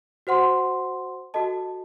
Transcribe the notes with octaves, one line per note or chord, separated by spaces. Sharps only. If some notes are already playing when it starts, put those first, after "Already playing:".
F#4 C5 F#5 C6
F#4 A4 D#5 A5